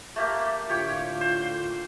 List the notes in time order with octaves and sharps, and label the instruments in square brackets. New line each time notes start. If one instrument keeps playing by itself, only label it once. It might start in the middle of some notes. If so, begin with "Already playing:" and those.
[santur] A3 A#3 G4
[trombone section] A2 D3 F4 [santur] G4 C#5 G5
[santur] C5